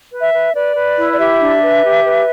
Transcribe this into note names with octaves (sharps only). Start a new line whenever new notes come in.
B4
E5
B4
B4 D5
B4
E4
D5
G4 E5
D4
B4
G4
B4